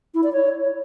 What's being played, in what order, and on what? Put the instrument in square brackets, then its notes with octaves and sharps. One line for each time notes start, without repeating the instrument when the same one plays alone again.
[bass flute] E4
D5
C#5